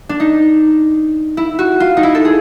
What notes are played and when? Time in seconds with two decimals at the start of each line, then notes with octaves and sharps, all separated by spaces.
0.09 D4
0.20 D#4
1.37 E4
1.59 F#4
1.80 F4
1.97 D#4
2.03 E4
2.15 A4
2.25 G#4